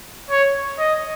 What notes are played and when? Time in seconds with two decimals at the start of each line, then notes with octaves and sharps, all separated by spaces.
0.31 C#5
0.79 D#5